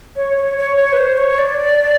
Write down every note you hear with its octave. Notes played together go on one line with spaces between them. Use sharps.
C#5
C#5
C#5
C#5
B4
C5
C#5
D5